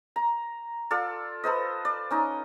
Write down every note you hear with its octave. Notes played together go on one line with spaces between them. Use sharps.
A#5
F4 A4 D5
A4 B4 C5 D#5
D5
C#4 D#4 D#5